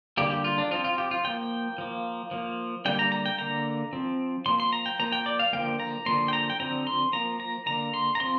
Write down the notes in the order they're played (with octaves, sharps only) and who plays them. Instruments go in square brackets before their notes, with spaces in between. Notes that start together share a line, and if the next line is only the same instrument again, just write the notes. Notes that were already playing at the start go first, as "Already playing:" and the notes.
[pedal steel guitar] D3 G3 A#3 G4
G4
F4
D4
F3 C4 F4
F4
G4
F4
F3 A#3 G5
F3 A#3
F3 A#3
D3 G3 A#3 G5
A#5
A#5
G5
D3 A#3 A#5
F3 C4
F3 A#3 C6
C6
A#5
G5
F3 A#3 A#5
G5
D5
F5
D3 F3 A#3 G5
A#5
D3 F3 A#3 C6
G5
A#5
G5
D3 F3 C4 A#5
C6
F3 A#3 A#5
A#5
D3 A#3 A#5
C6
A#5
F3 C4 C6